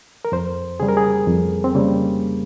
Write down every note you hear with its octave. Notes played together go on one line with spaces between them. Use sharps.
A#4
F2 C5
C#3 G3 G#4
A#4
G#4
F2
C4
C#3 G3 A#3